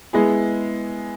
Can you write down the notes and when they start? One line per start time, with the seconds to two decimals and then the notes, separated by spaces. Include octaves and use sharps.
0.13 G#3 B3 E4 G#4